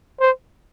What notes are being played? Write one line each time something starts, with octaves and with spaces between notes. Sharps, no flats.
C5